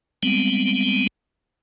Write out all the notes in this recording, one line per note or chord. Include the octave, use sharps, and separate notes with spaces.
G3 G#3 B3 C4